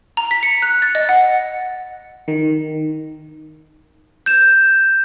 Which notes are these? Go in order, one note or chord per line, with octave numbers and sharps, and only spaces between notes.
A#5
B6
C#7
F#6
A6
D#5
F#5
D#3
G6 E7